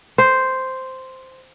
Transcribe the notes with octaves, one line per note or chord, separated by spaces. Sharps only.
C5